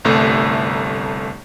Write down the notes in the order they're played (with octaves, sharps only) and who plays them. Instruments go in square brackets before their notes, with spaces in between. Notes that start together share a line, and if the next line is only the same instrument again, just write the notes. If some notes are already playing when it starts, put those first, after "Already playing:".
[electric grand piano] G1 C2 A3